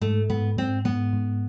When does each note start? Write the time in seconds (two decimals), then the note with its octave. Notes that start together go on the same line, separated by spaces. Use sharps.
0.01 G#2 A3
0.30 G#2 B3
0.57 G#2 C4
0.85 G#2 B3
1.13 G#2